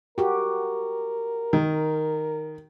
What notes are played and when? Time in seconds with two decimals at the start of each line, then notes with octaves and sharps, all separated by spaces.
0.18 F#4 G4 A#4
1.53 D#3